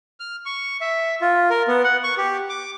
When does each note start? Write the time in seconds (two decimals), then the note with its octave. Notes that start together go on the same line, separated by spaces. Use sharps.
0.20 F6
0.46 C#6
0.81 E5
1.21 F4
1.50 A#4
1.68 B3
1.84 F#5
2.04 C#6
2.17 G4
2.49 D6